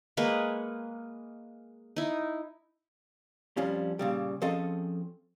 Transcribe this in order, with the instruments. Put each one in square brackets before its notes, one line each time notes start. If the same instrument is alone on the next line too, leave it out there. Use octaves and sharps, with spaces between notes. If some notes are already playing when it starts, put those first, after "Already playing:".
[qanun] G#3 A#3 B4 C#6
D#4 E4
[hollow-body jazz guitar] F2 F3 G3 C#4
A#2 C#3 G3
F3 C4 C#4 G#4 A4 D#5